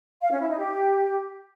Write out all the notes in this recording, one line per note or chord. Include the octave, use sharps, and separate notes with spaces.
F5
C#4
E4
D#4
G4